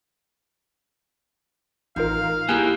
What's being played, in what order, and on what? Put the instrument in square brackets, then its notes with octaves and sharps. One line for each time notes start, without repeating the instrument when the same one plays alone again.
[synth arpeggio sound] A1 F4 A#4 [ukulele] D#4 [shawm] F5
[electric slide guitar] A#3 E4 G4 [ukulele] D#4 G#4 G#5 [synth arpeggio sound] F#6